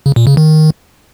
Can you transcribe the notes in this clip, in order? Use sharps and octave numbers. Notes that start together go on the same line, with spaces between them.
C#3
A#2
C#3
D#3